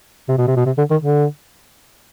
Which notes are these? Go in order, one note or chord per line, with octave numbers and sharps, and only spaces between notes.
C3
B2
C3
B2
C3
D3
D#3
D3